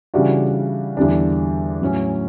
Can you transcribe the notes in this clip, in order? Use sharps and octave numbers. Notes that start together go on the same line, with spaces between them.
C#3 E3 G3 D4 F#4
E2 D3 G3 D4
A2 F#3 C#4